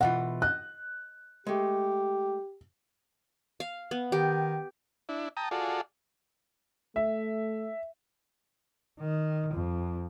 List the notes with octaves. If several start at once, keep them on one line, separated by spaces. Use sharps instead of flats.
B2 E3 F4 F#5
D#5 F#6
G#3 A3 G4
F5
B3
D#3 G4
D4 E4
G5 A5 A#5 D#6
F4 F#4 G#4 A4 D5
A3 E5
D#3
F2